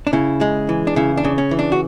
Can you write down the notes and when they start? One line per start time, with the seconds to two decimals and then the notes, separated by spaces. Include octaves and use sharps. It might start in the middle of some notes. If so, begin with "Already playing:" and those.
0.07 D4
0.13 C#3 E4
0.41 G#3
0.69 E3
0.87 D4
0.96 C#3 E4
1.17 D4
1.24 C#3
1.38 C#4
1.51 E3
1.59 D4
1.72 F#4